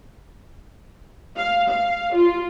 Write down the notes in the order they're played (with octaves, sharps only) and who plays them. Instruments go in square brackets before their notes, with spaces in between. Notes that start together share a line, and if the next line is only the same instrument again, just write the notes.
[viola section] F5
F5
F4